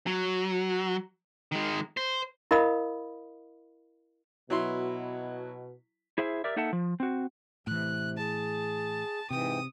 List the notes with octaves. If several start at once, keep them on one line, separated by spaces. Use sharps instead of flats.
F#3
D#3 G#3
C5
E4 A#4 D#5 F5 B5 D#6
B2 F#3 E4 C6
E4 G#4 C5 E5
G4 A#4 D5 E5
A#3 D#4 A4 E5 F#5 A5
F3
C4 F#4
A2 C3 E3 F#6
G#4 A5
G#2 C3 E3 G5 D#6